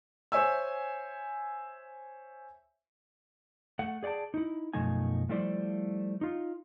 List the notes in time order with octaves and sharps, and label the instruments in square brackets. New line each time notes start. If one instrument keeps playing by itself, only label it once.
[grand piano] C5 C#5 E5 G#5 E6
[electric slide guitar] A3 F#5
G#4 D5 F#5 G5 A5
D#4 E4
F#2 B2 F3 A3 D#4 G#5
F3 G3 A3 E4 C5 D5
D#4 F4